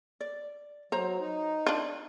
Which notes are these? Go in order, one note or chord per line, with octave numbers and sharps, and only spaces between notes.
D5
F#3 C5 A#5
D#4
D4 F4